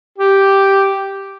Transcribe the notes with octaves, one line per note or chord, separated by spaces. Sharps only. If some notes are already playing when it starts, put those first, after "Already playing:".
G4